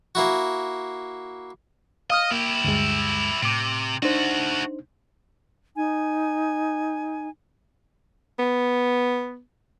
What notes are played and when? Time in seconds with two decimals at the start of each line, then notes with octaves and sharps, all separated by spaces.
0.15 A#3 E4 F#4
2.10 D#5 F5 D#6 F6
2.31 A#3 E4 G4
2.64 D2 G2 G#3
3.42 A2 C3 D6
4.02 A3 D4 D#4 F#4 C5
5.76 D#4 G#5
8.39 B3